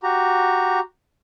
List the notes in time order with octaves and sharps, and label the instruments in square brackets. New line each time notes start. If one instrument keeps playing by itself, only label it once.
[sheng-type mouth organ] F#4 G4 A#5